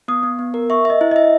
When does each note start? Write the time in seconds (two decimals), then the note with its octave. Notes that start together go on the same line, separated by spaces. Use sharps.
0.08 B3 D#6
0.23 B3
0.39 B3
0.54 A#4
0.70 E5 C#6
0.85 D#5 E5
1.01 E4
1.11 D#5 E5